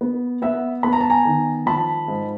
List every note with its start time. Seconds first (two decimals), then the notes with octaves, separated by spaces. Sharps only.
0.01 B3
0.42 B3 E5 F#5
0.83 B3 B5
0.93 A#5
1.01 A5
1.10 G#5 A#5
1.25 D#3
1.66 F3 A5 B5
2.08 G#2